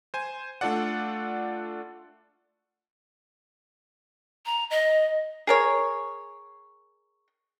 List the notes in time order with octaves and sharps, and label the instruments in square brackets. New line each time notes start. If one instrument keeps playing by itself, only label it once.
[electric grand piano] C5 G#5
A3 D4 F4 A4 D5 F#5
[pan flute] A#5
D#5
[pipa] G#4 A#4 C#5